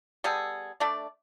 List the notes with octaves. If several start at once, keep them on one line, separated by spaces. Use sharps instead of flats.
G3 B3 G#4 A4
A3 D4 D5